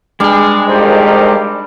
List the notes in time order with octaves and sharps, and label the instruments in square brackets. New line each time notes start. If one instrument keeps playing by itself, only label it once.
[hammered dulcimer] G3 D4 [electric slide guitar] G#3 G#4
[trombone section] F2 A#2 D#3 [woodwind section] D#4 G4 C5